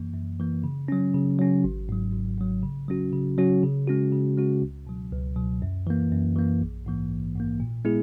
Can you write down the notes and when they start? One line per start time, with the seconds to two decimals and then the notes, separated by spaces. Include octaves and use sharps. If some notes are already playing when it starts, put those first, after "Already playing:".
Already playing: F#2 E3 A#3
0.14 F#2
0.40 E3 A#3
0.64 C#3
0.88 F#3 C#4
1.14 C#3
1.39 F#3 C#4
1.64 G#1
1.89 G#2 F#3
2.13 G#1
2.38 G#2 F#3
2.63 C#3
2.88 F#3 C#4 F#4
3.12 C#3
3.38 F#3 C#4 F#4
3.63 C#3
3.87 G#3 C#4 F#4
4.12 C#3
4.37 G#3 C#4 F#4
4.62 C#2
4.87 B2 F#3
5.12 C#2
5.36 B2 F#3
5.62 F#2
5.87 E3 A#3
6.12 F#2
6.36 E3 A#3
6.62 A#1
6.86 G#2 E3 A#3
7.10 A#1
7.35 G#2 E3 A#3
7.60 A#2
7.85 G#3 B3 E4 G#4